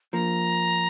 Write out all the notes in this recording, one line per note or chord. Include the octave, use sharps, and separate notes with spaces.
F3 A#3 A#5